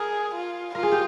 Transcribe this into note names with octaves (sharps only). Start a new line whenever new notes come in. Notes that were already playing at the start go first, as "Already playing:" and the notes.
Already playing: G#4 A#4
F4
F4 A#4
G#4
G4